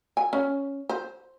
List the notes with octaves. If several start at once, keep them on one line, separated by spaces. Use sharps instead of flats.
G#5
C#4
C5